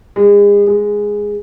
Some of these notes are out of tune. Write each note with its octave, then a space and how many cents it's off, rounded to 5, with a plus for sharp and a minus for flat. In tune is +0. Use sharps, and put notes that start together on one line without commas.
G#3 -35
G#3 -5